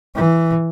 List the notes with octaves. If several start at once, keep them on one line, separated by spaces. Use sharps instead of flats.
E3